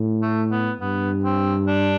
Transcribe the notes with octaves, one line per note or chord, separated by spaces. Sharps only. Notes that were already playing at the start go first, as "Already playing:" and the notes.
Already playing: A2
A3
B3
G2 B3
C4
D4